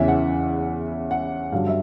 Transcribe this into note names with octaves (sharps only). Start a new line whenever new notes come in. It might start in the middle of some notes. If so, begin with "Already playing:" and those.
Already playing: E2 C#3 E3 E5
F#5
F#5
G2 D3 F#3 F5
E5